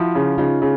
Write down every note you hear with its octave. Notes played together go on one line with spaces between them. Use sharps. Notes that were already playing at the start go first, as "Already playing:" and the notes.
Already playing: F3 E4 F#4
C#3
C#3 D#4 F4
C#3